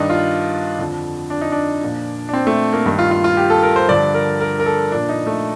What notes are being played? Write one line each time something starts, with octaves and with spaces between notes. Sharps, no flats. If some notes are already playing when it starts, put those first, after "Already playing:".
Already playing: G2 D#3 D4 D#4
F4
F2 D3 F3
D4
D#4
D4
A#2 F3
D4
C4
A3
A#3
G2 D#3
F4
F4
F4
G4
A4
A#4
C5
G2 D3 F3 D5
A#4
A#4
A#4
A4
A#2 F3 D4
D#4
A3